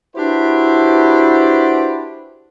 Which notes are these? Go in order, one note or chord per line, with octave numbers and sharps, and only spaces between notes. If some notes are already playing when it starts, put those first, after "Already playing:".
D4 E4 F#4 G4 B4 C5